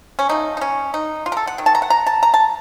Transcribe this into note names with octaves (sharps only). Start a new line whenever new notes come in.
C#4
C#3 F3 A3 D#4
D#4
C#4
D#4
F4
A#4
A4
F#5
D#3 F#3
A5
A#5
F#5
A#5
A5
A#5
A5